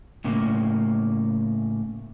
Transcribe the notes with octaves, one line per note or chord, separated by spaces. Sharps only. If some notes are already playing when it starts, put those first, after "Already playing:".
A2 C#3 A#3